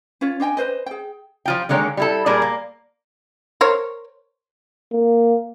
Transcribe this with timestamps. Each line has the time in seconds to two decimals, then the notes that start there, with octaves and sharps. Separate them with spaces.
0.21 C#4 F4 C#5
0.40 D4 D#5 G5 G#5
0.57 B4 C5 D#5
0.86 G#4 G5
1.45 F3 F4 G5
1.69 D3 D#3 G#3 A#3 C#5 G5
1.97 G3 E4 A4
2.26 A#2 G3 G#4 A#4 D5
2.42 A#3
3.61 A#4 C5 C#5
4.92 A#3